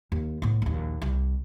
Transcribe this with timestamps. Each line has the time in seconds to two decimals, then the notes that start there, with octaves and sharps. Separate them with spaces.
0.12 D#2
0.42 A2 B3
0.62 A#1 D#2
1.02 C2